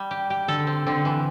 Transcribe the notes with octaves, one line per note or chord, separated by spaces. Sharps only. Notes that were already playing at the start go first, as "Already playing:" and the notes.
Already playing: G3
G4
G4
D3 A4
C4
D3 C4
E3